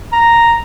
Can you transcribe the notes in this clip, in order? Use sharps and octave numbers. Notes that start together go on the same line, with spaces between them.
A#5